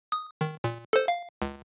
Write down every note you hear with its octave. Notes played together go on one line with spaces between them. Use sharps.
D#6
D#3
A#2
A4 C5
F5
C#2